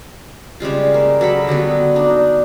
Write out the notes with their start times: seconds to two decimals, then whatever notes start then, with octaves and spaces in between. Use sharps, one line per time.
0.60 C#3 G3 G#3 F4
0.94 A#3
1.21 F#3 A4 B5
1.47 D3 F#3 G3 B3
1.95 D4 D#4